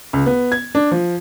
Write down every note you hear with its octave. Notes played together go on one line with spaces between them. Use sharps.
C#2
B3
G#6
D4
F3